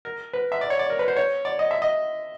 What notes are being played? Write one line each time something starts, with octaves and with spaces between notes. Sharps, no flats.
A#4
B4
E5
D5
C#5
D5
A#4
B4
C5
C#5
D5
D#5
E5
D#5